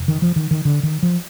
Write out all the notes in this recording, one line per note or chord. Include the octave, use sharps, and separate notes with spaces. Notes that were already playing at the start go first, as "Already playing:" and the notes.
Already playing: F1 F2 C3
D#3
F3
D#3
D#3
D3
D#3
F3